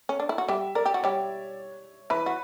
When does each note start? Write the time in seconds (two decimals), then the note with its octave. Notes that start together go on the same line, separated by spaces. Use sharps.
0.09 C#4
0.20 D4
0.29 E4
0.38 F#4
0.48 G3 G4 E5
0.75 A#4 D5
0.86 G4
0.94 F#4
1.03 G3 G4 C#5
2.10 E3 E4 B4
2.26 F#4